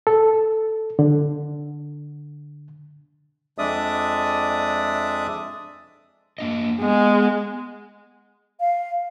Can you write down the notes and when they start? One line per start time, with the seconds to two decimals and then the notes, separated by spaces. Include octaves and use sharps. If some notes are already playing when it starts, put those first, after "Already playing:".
0.07 A4
0.99 D3
3.58 F2 G#3 D4 D5 E5 D#6
6.38 A#3 D4 D#5
6.82 G#3 B3
8.60 F5